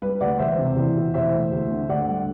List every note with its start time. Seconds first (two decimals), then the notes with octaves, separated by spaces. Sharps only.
0.02 G3 B4
0.21 D2 D5 F#5
0.39 E1 C5 E5
0.58 C3
0.76 E2
0.96 B2
1.14 E2 C5 E5
1.33 A3
1.52 D2
1.71 D3
1.89 D2 D5 F#5
2.08 G3